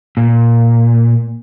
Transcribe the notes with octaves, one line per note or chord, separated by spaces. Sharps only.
A#2